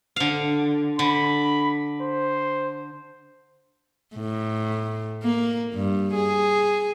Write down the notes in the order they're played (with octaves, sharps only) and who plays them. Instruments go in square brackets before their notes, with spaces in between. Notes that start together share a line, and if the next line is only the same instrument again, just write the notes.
[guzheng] D3 F5
[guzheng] D3 [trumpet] B5
[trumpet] C5
[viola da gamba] A2
A#3
G2
G#4